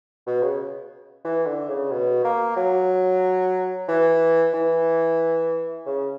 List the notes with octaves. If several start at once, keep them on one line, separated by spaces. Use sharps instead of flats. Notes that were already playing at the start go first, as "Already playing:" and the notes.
B2
C#3
E3
D3
C#3
B2
A#3
F#3
E3
E3
C#3